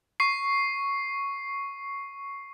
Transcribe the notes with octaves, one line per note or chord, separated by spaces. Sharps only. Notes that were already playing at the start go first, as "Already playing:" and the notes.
C#6 C7